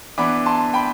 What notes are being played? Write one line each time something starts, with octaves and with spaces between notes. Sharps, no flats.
E3 B3 D4 B5 D6
A5 C6
G5 B5